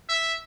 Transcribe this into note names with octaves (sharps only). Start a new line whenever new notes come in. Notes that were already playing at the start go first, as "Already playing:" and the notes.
E5